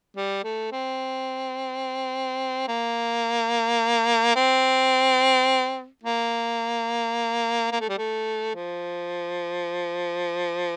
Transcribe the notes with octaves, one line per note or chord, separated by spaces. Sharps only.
G3
A3
C4
A#3
C4
A#3
A#3
A3
G3
A3
F3